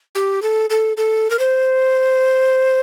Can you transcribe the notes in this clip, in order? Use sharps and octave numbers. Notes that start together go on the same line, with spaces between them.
G4
A4
A4
A4
A#4
C5